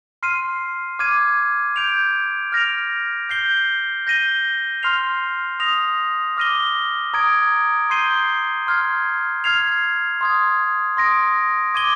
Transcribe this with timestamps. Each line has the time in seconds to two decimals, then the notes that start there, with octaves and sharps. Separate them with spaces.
0.23 C6 F6 C7 D#7
0.99 D6 F6 G#6 D#7
1.76 G6 D7 F7
2.52 F6 A#6 D7 F7
3.29 G6 C7 G7
4.07 G6 A#6 D#7 G7
4.83 C6 F6 C7 F7
5.60 D#6 A#6 F7
6.37 D6 F6 A#6 D#7 G7
7.14 A#5 D#6 G#6 D7
7.90 C6 G6 C7 D#7 G7
8.67 C6 F6 G#6 C7
9.44 F6 G#6 C7 F7
10.21 C6 D#6 G#6
10.97 C6 D#6 A#6 D7
11.75 D6 G#6 D#7 G7